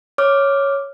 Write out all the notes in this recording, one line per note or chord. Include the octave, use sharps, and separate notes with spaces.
C#5 D6 F6